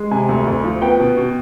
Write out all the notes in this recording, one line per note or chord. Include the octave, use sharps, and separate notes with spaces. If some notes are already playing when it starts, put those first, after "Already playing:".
Already playing: G#3
C3 G#5
D2
D2
F3
B3 G5
B2
B2